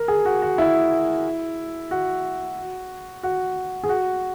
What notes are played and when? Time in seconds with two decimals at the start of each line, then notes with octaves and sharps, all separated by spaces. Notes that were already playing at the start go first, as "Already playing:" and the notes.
Already playing: A#4
0.08 G#4
0.25 F#4
0.42 F#4
0.58 E4
1.91 F#4
3.23 F#4
3.84 G#4
3.89 F#4